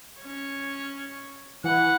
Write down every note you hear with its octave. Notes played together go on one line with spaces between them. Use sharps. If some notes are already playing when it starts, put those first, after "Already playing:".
C#4 C#5
E3 B4 F#5